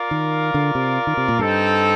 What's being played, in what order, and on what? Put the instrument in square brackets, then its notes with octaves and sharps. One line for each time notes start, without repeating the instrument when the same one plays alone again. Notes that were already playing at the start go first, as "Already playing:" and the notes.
Already playing: [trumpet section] F4 A#4 D5 F5
[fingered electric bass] D#3
D3
C3
D#3
C3
A#2
[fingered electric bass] G2 [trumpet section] C4 D#4 A4